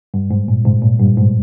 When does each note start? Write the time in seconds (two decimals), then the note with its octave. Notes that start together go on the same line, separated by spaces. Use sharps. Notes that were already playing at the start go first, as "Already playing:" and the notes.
0.14 G2
0.30 G#2
0.48 A#2
0.65 G#2 C3
0.82 A#2
0.99 G2
1.17 G#2